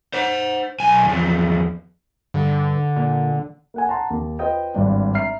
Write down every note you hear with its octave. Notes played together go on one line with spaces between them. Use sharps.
C5 F#5
B1 G#5
E2 F3
G2 D3
A#2
A#3 F#5 G#5
F#5 A5 A#5 C6
D#2
F4 B4 C5 D#5 G5
G#1 G2 D4
E5 A#5 F6 C7